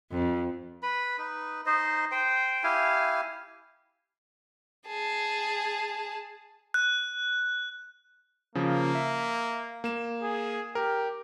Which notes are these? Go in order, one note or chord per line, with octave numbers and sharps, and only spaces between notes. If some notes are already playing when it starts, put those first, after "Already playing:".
F2
B4 B5
D#4 B4
D#4 C5 D#5
C5 G5
E4 G4 F5 G#5
G#4 A5
F#6
C#3 F3 A#3
E5
A#3 E7
G#4
G4 A#4